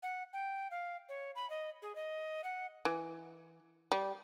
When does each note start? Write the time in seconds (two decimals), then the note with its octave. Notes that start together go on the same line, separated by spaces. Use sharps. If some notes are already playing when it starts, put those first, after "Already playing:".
0.03 F#5
0.33 G5
0.71 F5
1.09 C#5
1.35 B5
1.50 D#5
1.82 G#4
1.95 D#5
2.44 F#5
2.85 E3
3.92 G3